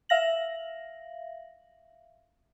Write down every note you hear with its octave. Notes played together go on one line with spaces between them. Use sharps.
E5 F5 A#6 F#7